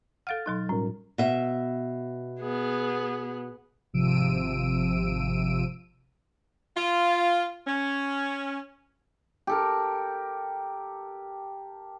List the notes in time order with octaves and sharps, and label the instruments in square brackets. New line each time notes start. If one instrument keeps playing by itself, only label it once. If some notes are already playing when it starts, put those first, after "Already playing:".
[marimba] A4 F5 F#5 [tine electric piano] F6 A6
[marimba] B2 F#3 D#4
[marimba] A2 [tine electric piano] G3 C#4 A#4
[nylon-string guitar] B2 E5
[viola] B3 G#4
[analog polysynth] G#1 C3 F3 E6 D7 D#7
[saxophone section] F4
C#4
[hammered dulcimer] G4 A4 A#4